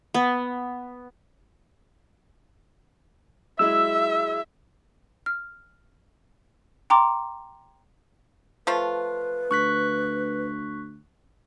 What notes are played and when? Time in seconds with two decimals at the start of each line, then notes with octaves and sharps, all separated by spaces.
0.14 B3
3.59 F#3 G#3 E4 E5 E6
5.26 F6
6.90 G5 A#5 C6 D6
8.67 F3 A3 F4 B4
9.51 D2 C#6 F#6 B6